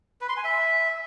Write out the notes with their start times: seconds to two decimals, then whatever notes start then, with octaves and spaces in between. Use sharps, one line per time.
0.21 B4
0.29 C6
0.37 G#5
0.44 E5